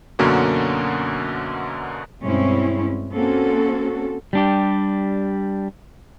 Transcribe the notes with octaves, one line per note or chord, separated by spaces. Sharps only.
F#2 B2 D3 A#3 C#4 F#4
G2 B2 G#3 C4 C#4 E4
A#3 C4 C#4 F#4 A4
G3 D4 G4